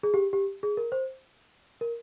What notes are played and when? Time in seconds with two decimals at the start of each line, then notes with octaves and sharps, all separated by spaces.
0.03 G#4
0.14 G4
0.33 G4
0.63 G#4
0.77 A#4
0.92 C5
1.81 A#4